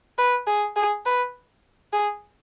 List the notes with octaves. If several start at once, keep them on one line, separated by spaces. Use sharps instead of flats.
B4
G#4
G#4
B4
G#4